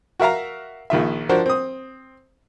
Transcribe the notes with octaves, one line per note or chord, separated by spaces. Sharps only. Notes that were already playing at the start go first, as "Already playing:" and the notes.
F#4 A#4 E5 F5 A#5
A#1 D#3 F4 E5
F3 D4 F#4 A#4 C5
C4 D#6